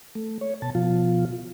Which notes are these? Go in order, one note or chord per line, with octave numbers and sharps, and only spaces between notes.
A3
C#5
B2 A5
B2 F3 F4